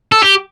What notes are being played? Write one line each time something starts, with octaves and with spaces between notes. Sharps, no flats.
A4
G4